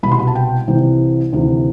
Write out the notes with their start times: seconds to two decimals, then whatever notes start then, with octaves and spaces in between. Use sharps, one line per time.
0.03 C2 B2 B5
0.11 C6
0.19 B5
0.27 A5
0.35 G5
0.68 C2 C3 E3
1.32 D2 C3 E3